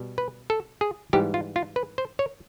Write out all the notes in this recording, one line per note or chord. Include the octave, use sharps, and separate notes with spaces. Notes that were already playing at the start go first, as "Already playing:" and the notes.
Already playing: B2 G3
B4
A4
G#4
G#2 E3 G3 G4
F4
F4
B4
C5
C#5